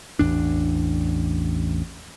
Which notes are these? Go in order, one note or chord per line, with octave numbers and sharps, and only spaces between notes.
A1 E2 D4